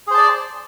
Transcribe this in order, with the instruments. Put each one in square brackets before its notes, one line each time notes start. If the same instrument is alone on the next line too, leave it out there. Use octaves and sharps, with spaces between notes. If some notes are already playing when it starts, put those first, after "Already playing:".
[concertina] G#4
C5
A5
D5